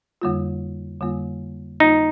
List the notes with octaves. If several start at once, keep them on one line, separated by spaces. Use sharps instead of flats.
F2 D3 G3 A#3 F4
F2 D3 G3 A#3 F4
F2 D3 G3 A#3 D#4 F4